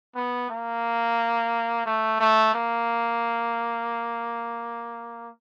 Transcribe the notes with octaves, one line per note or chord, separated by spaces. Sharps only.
B3
A#3
A3
A3
A#3